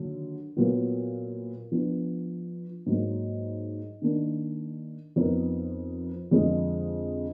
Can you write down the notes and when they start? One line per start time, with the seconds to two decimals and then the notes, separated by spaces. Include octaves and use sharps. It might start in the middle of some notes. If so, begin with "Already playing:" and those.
Already playing: D#2 D3 F#3
0.57 A#2 F#3 B3 F4
1.72 F3 B3 D4
2.86 G#2 F#3 A#3
4.02 D#3 A#3 D4
5.16 F2 F3 B3 D#4 A#4
6.31 F2 D3 G#3 D4 F4